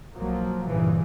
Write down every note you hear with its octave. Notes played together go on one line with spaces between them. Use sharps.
B1 F3 F#3 A#3
G2 A#2 C#3 E3